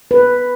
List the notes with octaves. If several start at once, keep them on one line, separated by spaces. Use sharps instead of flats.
B4